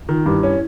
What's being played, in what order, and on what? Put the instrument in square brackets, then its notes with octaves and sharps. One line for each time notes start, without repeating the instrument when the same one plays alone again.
[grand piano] D#3 [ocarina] F4
[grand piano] G2 [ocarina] E4
[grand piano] C#4